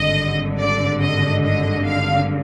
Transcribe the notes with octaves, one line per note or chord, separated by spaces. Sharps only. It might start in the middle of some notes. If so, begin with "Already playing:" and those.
Already playing: G#1 G2 D3 D#5
D5
D#5
D#5
F5